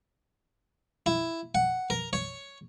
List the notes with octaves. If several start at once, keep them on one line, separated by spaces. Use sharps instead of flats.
E4
F#5
A#4
C#5